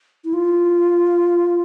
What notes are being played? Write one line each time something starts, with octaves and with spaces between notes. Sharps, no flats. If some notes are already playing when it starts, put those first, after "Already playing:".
E4
F4